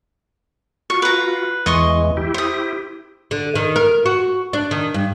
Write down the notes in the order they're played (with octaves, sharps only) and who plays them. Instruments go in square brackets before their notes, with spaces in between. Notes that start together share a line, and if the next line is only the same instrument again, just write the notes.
[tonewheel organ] F4 F#4 [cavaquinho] C#6
[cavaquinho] B4 A#5
[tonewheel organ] E2 E3 G#3 [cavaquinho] D#5 C6 C#6
[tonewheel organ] E4 G4
[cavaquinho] C5 D#6
[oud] D3
D#3
A#4
F#4
D4
D#3
G2